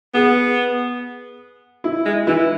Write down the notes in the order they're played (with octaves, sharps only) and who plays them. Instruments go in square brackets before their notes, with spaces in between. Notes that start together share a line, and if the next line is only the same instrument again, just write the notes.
[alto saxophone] B3 [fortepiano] G#4
[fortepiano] E4
[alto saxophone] G#3
[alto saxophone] E3 [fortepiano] E4